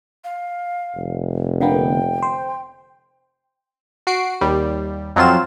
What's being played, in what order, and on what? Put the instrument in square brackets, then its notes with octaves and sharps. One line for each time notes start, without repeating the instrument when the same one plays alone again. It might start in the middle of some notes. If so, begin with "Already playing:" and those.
[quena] F5
[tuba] F1
[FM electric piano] D3 A#3 B3 [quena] G5
[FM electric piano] C5
[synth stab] F#4 C7 D7
D#2 G3
F2 F#3 C4 F4 E7